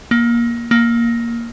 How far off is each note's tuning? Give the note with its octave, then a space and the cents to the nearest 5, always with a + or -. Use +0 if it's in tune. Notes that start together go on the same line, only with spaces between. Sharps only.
A#3 +20
A#3 +5